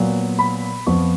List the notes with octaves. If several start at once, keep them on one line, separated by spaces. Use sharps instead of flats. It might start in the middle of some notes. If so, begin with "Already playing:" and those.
Already playing: A#2 F#3 B3
B5
F2 F3 B3 F4 C#6